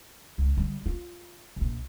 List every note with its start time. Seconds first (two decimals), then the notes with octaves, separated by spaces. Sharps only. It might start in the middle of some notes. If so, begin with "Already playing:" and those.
0.38 C#2
0.57 D3 G3
0.86 F4
1.56 E1 A#1